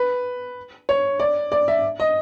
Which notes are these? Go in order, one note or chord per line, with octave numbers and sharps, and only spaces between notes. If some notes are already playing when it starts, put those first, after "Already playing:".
Already playing: B4
C#5
D5
D5
E5
D#5